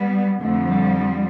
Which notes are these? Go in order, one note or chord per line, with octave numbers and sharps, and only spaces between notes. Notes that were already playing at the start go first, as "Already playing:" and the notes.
Already playing: G3 B3
F2 D3 F3 A3
G3